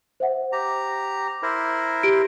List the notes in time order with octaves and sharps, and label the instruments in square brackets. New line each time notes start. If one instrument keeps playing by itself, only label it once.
[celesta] C5 E5 F#5
[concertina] G4 A#5
E4 A#4 C5
[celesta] G4 D7